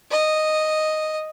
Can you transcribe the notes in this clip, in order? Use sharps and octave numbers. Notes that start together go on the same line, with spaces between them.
D#5